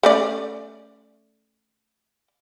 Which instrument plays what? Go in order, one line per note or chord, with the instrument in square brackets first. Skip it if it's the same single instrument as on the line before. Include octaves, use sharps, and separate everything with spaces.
[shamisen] A3 C#4 D5